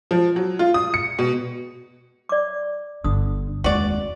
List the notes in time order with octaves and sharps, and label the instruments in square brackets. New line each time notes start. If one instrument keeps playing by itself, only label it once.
[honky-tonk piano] F3
F#3
F4
D#6
C#7
B2
[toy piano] D5 D6
[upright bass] G1 [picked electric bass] D3 [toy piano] D#6
[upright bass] F1 [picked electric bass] D#2 G#3 [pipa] F#4 D5